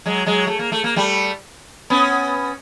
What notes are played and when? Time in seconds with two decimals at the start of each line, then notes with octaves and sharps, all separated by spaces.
0.06 F#3 G#3
0.26 F#3 G#3
0.47 A3
0.59 A#3
0.72 A3
0.84 A#3
0.96 G3 A3
1.90 B3 C#4